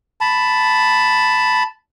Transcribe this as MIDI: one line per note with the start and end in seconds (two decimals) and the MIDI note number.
0.21 1.63 81
0.21 1.63 83